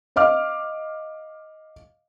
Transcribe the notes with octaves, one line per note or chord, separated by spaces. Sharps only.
D#5 F5 D6 F6